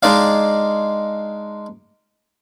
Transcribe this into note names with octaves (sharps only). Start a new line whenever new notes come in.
G#3 D4 D#4 D5 F5